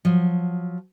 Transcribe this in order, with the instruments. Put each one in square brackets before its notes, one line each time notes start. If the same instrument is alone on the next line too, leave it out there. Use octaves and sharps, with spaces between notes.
[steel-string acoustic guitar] F3 F#3